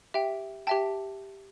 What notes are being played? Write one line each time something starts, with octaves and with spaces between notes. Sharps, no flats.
G4 E5 G5
G4 E5 G5 A5